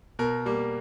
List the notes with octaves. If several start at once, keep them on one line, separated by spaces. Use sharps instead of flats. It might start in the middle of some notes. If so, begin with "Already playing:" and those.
B2 A#4
G3 A#3